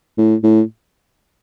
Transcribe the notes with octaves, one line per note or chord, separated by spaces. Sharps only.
A2
A2